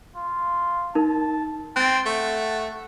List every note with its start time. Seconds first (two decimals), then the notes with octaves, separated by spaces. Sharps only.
0.16 F4
0.95 D#4 A#4 A5
1.76 C4 G5 F#6 A6
2.06 A3 F#5